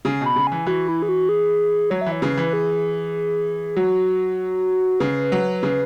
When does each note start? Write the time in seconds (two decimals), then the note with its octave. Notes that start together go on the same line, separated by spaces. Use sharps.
0.05 C#3 G#5
0.21 B2
0.26 B5
0.36 C#3
0.47 E3 G#5
0.66 E3 F#4
0.88 E4
1.02 G#4
1.09 F#4
1.29 G#4
1.90 F#3 C#5
2.01 E3 E5
2.12 C#5
2.22 C#3 B4
2.37 E3
2.53 G#4
3.76 F#3 F#4
5.00 C#3 B4
5.32 F#3
5.63 C#3